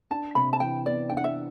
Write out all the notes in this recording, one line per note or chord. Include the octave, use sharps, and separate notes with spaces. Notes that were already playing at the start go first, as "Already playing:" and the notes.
D4 A5
C3 B5
A5
E3 G5
B3 D5
D4 G5
F#5
E5